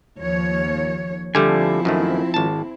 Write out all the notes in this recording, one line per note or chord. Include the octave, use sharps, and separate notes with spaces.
D#2 F3 C#5
D3 F3 G3 A3 C4 E4 G#5
F#2 D#3 A3
G#1 A5